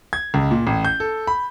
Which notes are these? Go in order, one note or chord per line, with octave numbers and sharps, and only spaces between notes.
G#6
C#2
A#2
A1
G6
A4
B5